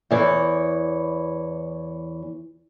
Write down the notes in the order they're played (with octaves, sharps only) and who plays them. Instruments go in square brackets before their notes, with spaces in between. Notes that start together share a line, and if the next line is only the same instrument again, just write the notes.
[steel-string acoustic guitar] E2 E3 C#5